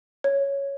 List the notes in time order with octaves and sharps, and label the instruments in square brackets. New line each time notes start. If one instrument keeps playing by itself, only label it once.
[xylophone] C#5